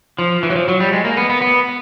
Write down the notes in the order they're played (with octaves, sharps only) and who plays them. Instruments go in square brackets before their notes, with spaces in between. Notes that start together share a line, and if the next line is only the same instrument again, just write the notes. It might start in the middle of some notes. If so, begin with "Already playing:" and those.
[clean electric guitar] F3
E3
F#3
F3
F#3
G3
G#3
A#3
B3
B3
B3